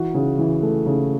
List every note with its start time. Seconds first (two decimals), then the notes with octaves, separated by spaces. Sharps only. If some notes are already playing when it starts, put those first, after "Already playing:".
Already playing: E3 F#4
0.14 C#3
0.38 E3
0.62 A3
0.86 C#3